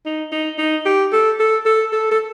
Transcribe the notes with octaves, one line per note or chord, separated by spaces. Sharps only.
D#4
D#4
D#4
G4
A4
A4
A4
A4
A4